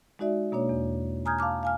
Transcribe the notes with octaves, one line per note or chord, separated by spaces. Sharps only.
G#3 D#4 F#4 D5 E5
B2 A#3 D4 C#5
E2
G#5 A#5 D#6 F6 G6 G#6
F5 A5 D6 F6
F5 G#5 F6